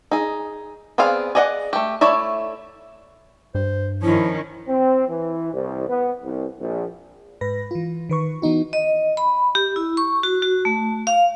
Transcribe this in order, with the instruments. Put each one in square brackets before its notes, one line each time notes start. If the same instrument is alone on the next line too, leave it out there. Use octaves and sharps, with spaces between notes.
[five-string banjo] D#4 G#4
B3 C4 G#4 D5 F5
G#4 D5 D#5 F5 F#5
A3 G4
A3 E4 C#5 D5 E5
[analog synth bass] G2 [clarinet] C5
[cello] D#3 C#4 [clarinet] F3 [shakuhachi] E4
[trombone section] C4
E3
C2
B3
C2
A#1
[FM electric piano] G#2 B4 B5 A#6
E3 F4
D#3 B4 C#6
E3 B3 D#4 F#4
[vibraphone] D#5
B5
G4
E4
C#6
F#4
F#4
A3
F5